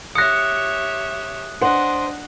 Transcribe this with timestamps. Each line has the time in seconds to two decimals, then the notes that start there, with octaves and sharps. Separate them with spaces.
0.15 G4 C#5 E5 D#6 F#6 A#6 C#7
1.62 D4 C5 D#5 F#5